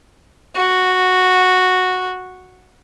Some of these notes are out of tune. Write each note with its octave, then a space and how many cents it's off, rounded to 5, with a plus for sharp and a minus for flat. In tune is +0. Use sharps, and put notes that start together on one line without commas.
F#4 -5